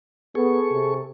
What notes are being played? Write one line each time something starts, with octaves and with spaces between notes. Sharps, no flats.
B3 G#4 A4 C#6
C3